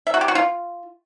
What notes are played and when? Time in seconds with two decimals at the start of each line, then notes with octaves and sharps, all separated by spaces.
0.07 E5
0.14 F#4
0.21 G4
0.28 F#4
0.35 F4